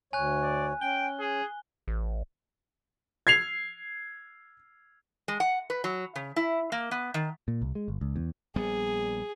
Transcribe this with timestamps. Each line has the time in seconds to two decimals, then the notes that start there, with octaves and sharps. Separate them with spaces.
0.13 D2 C#5 G#5 F#6
0.42 D5
0.81 C#4 G5 G7
1.20 G#4
1.88 A1
3.27 G#6 C7 F7
5.28 G#3
5.40 F#5
5.70 B4
5.84 F#3
6.16 C#3
6.36 E4
6.72 A#3
6.91 B3
7.14 D#3
7.48 A#2
7.62 C2
7.75 G#3
7.88 G1
8.01 C#2
8.16 E2
8.56 A#1 G3 B3 G#4